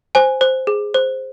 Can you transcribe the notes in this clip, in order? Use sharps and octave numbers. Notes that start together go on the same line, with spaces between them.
C5 G#5
C5
G#4
C5